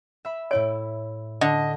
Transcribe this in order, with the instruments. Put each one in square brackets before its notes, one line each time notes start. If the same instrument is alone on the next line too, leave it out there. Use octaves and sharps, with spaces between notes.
[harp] E5 B5
[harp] A2 E4 D7 [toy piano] C#5
[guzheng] D3 [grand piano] D#5